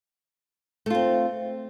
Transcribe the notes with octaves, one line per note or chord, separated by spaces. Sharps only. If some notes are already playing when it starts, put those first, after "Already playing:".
A3 C4 F4